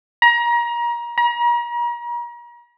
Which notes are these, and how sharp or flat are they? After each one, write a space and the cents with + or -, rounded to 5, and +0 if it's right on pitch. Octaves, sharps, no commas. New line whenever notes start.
A#5 +30
A#5 +40